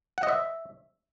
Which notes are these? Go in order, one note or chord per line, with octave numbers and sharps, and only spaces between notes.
F#5
D#5
E5